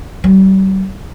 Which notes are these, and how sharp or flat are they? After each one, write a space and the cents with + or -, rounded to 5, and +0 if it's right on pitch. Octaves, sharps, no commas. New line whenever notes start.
G3 -40